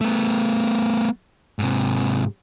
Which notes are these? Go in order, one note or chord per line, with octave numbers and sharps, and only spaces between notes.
A3 B3
G#2 C3